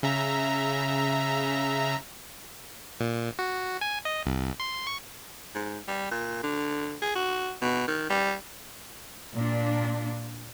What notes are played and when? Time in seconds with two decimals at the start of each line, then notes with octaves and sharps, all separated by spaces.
0.03 C#3 E5 A#5
3.00 A#2
3.39 F#4
3.81 G#5
4.05 D#5
4.26 C2
4.60 C6
4.87 C#6
5.55 G#2
5.88 G3
6.11 A#2
6.43 D3
7.02 G#4
7.15 F#4
7.62 B2
7.88 D#3
8.10 G3
9.36 A#2 D4